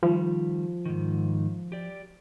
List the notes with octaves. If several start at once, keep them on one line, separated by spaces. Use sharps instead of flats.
D#3 F3 G3
G#2 D#3
G4 D5